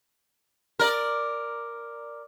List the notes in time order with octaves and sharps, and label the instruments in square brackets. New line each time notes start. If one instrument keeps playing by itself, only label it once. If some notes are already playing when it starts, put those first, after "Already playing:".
[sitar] A#4 D5